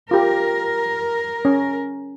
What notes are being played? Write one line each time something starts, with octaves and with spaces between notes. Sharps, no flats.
F4 G4 A#4
C#4